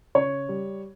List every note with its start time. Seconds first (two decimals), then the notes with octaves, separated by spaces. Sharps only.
0.15 C#3 C#5
0.49 G3